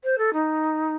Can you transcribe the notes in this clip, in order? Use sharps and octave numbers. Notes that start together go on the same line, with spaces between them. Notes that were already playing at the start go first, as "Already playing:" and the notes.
C5
A4
D#4